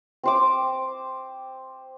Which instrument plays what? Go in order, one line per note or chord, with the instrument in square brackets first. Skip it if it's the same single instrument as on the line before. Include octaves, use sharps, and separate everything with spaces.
[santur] C4 C5 D6